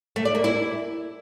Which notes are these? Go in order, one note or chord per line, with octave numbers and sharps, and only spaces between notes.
A3
D5
A#3
E4